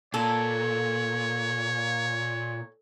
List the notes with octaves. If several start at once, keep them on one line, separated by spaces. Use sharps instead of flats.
A#2 A4 C#5